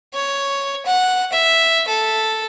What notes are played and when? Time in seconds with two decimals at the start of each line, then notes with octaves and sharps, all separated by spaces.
0.14 C#5
0.86 F#5
1.32 E5
1.88 A4